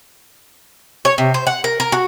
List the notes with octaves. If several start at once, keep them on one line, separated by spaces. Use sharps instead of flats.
C#5
C3
C5
F#5
A#4
A#4
F#4